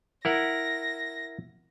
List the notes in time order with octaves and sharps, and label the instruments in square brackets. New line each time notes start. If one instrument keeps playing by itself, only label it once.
[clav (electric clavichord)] E4 A#4 F#5 [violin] A#6